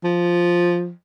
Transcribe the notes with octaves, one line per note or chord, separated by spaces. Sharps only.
F3